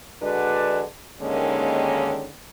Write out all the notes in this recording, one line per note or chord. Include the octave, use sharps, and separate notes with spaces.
D3 G#3 D4 F#4 B4 D5
D#2 D3 D#3 G#3 A#3 C#4